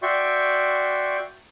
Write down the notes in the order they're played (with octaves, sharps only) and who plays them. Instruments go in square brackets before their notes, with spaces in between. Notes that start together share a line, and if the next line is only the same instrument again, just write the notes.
[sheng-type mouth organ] F#4 D5 E5 G5 C6 C#6